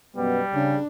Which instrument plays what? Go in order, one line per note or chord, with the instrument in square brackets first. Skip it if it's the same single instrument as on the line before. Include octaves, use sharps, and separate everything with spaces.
[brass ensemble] F#2 B2 B3 [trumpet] G3
[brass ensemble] C#3 [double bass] D4